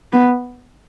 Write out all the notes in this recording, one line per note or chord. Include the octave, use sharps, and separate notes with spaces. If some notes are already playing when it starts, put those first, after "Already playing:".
B3